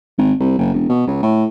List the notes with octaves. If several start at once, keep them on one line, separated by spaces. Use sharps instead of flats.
G#1
C2
F#1
E1
B2
C#2
A2